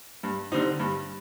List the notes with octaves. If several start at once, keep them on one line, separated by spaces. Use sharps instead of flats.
G2
D3 G3 C4 D#4
G2